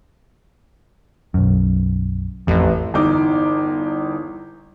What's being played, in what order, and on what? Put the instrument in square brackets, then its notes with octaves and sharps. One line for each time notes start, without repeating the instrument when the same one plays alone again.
[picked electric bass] B1 F#2
[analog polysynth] A1 [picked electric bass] F2
[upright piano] G1 E2 D#4 D6